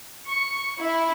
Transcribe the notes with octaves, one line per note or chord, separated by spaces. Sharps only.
C#6
E4